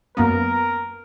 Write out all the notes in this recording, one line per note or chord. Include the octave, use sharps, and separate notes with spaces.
F#2 A#3 B3 A#4